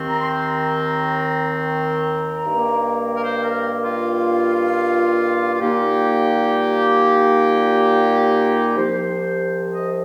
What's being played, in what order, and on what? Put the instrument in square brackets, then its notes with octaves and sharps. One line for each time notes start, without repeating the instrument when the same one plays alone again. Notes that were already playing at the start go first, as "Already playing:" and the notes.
Already playing: [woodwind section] D#2 D#3 C4
A#5
C6
A#5
A#5
G2 D#3 A#3
A#4
C5
A#4
F4
F4
A#2 G3 A#3 D#4 G4
C2 C3 F3 C5
D#5